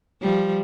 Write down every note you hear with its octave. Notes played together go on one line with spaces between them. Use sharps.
F3 G3